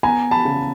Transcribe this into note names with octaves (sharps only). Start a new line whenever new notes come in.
B3 G#5 A#5
A5 B5
C#3